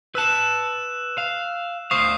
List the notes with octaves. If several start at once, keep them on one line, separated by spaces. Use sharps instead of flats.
B4 A5 E6 F#6 E7
F5
D2 C5 F5 C#6 D#6 C7